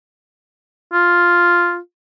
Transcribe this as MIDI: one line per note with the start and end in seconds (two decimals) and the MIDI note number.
0.93 1.78 65